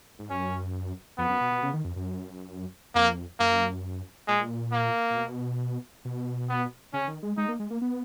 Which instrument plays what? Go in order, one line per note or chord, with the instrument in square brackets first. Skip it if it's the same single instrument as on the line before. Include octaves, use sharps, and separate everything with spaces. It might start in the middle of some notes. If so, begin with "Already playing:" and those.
[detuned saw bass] G#2
[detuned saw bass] F#2 [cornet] C#4
[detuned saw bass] F2 [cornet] B3
[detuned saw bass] F#2
B2
B2
C#3
D#3
F2
F#2
[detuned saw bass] F2 [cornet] A#3
[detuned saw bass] F#2 [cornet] A#3
[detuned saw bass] A#2 [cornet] G#3
[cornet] A#3
[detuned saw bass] A#2
B2
B2
[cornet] B3
[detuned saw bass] C#3 [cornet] C#4
[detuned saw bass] D#3
G#3
[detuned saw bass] G#3 [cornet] D#4
[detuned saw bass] A#3
G#3
A#3
B3